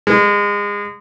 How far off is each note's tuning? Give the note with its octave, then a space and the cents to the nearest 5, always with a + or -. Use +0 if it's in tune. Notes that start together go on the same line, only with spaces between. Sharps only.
G#3 -30